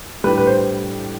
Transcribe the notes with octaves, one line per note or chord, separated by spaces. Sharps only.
A2 G3 D4 B4
B4
C5